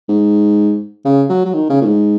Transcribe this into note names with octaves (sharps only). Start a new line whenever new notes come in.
G#2
C#3
F#3
F#3
D#3
C#3
A#2
G#2